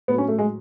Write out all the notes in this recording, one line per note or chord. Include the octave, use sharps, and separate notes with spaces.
A2 F#3 B3
C#4
A3
G#3